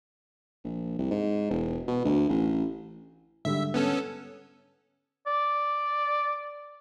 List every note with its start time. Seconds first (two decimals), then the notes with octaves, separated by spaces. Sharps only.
0.64 A#1
0.99 C2
1.11 G#2
1.51 E1
1.88 B2
2.05 D2
2.29 A1
3.45 G#2 D3 G3 E5
3.74 B3 C#4 A4
5.27 D5